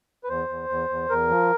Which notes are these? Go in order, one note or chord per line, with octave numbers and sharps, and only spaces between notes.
B4
E2 C5
E2
E2
E2
E2 A#4
F3